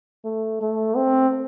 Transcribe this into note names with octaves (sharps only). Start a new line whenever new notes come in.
A3
A3
C4